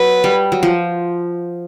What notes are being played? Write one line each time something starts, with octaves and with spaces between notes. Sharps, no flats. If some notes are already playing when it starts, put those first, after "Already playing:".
Already playing: F#3 B4
G3
F#3
F3